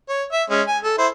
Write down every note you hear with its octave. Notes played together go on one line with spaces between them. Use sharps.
C#5
E5
G#3 C#4
G#5
A4
E4 C5